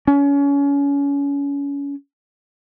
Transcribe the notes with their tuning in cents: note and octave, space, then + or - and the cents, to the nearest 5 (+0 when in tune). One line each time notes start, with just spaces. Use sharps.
C#4 +30